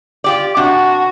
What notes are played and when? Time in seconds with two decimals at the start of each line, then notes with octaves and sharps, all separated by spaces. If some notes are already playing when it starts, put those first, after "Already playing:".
0.24 F4 G4 D5
0.57 C3 D4 F#4